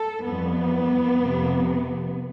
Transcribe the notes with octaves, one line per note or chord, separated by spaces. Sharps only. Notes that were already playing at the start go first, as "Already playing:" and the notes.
Already playing: A4
F2 E3 G3 B3
F2 C3 F3